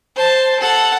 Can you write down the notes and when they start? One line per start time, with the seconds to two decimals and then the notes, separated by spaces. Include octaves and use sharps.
0.16 C5 A5
0.59 A4 F#5